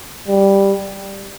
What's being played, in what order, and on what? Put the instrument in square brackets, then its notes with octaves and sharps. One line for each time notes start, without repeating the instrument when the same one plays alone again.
[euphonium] G3